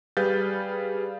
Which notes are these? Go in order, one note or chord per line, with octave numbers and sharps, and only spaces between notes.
G3 G#4 B4 F5 G6 A6